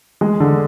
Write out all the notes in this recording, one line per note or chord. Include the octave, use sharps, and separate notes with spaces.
G#3
D3